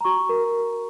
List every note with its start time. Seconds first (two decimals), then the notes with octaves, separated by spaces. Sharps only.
0.01 A#5
0.05 F#4 C#6
0.29 A#4